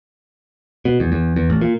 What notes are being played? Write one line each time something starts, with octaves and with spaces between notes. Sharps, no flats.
B2
E2
E2
E2
A1
A#2